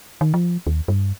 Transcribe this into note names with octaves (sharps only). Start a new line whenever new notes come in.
D#3
F3
D#2
G2